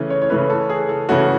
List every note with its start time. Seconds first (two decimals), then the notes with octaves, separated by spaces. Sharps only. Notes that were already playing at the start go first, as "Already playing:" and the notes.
Already playing: C#3 E3 A3 C#4
0.10 C#5
0.21 C#5
0.30 C#3 E3 A3 C#4 B4
0.50 A4
0.69 G#4
0.89 A4
1.09 C#3 E3 A3 C#4 F#4